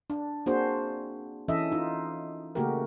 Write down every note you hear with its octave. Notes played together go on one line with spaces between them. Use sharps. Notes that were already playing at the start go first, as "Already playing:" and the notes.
D4
A#3 C4 D4 F#4 G#4 C5
E3 C#4 A4 D#5 E5
D#4 F4
C#3 A3 A#3 F#4 G4 A#4